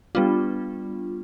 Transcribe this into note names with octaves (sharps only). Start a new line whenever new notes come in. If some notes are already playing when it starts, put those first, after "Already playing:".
G3 B3 D4 F4